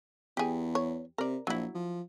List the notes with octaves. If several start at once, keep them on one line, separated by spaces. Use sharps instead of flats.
E2 G4 G#4
C#5
C3 A#4 D5
A#1 F#3 E4
F3